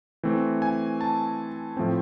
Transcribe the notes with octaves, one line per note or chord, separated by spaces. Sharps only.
E3 A3 C4
G#5
A5
A2 F3 A3 C4